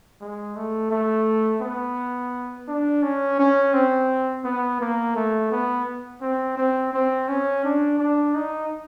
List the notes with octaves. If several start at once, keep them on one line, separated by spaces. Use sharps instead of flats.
G#3
A3
A3
B3
D4
C#4
C#4
C4
B3
A#3
A3
B3
C4
C4
C4
C#4
D4
D4
D#4